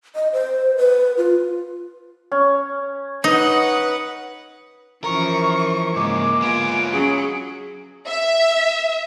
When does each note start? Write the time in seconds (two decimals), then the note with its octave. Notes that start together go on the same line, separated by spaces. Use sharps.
0.15 D#5
0.33 C5
0.77 B4
1.17 F4
2.32 C#4
3.24 D#4 B4 D#5 F#5
5.04 F#2 E3 F3 A#4 C#6
5.96 G#2 C#3 G#3 A#3 D6
6.42 B3 F4 G#5 D7
6.92 F#3 C#4 G#4
8.07 E5